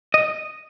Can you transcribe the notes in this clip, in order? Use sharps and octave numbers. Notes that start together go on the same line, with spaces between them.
D#5